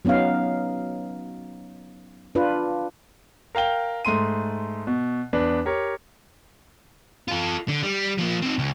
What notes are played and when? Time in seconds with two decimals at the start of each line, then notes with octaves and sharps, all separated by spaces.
0.05 F#3 B3 C#4 D#4 F5
2.35 D4 F4 B4
3.55 A#4 F5 G5 G7
4.05 G#2 A3 C6 D#7
4.87 B2
5.33 E2 D4 B4
5.66 G4 A#4 C#5
7.28 F4 A4
7.68 D3
7.83 G3
8.18 F3 A#3
8.42 C4 D#4
8.59 C#2